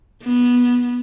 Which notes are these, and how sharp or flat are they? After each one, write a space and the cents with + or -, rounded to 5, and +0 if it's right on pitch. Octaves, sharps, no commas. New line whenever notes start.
B3 -15